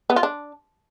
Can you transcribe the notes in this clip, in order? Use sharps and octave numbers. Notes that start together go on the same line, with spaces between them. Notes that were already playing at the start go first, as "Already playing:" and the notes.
B3
F4
D4